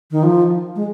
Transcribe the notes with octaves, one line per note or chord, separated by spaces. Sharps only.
D#3
F3
G#3